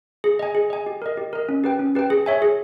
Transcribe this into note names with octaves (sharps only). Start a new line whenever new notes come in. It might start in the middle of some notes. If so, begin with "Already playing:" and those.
G#4
D#5 G#5
G#4
D#5 G#5
G4
A#4 D#5
G4
A#4 D#5
C#4
G4 B4 G5
C#4
G4 B4 G5
G#4
C#5 E5 G#5
G#4